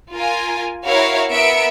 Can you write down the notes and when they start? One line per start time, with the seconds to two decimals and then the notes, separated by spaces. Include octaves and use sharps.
0.14 F4 A#4 G#5
0.86 E4 F#4 A#4 C#5 F5
1.31 B3 A#4 E5 C#7 D7